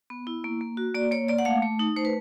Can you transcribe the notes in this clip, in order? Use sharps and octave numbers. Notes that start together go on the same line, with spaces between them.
B3
E4
A#3
A#3
F#4
A#3 D5
A#3 C#5
A#3 D5
F#5
A3 F5
A3
D#4
A3 C5
B4